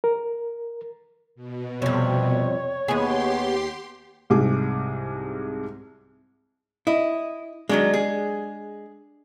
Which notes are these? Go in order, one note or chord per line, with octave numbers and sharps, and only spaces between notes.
A#4
B2
F2 C3 G3 C#5
D#2 B3 G4 G#4 C6
C2 G#2 C3 G#4 D6
E4 D#5
D#3 F#3 G#3 D4
G#4